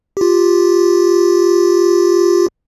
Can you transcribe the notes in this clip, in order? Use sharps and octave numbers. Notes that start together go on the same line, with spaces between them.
F4 G4